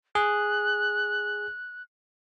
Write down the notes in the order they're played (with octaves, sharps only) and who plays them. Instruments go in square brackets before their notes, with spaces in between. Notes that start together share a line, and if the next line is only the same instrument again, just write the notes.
[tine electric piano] G#4 [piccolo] F#6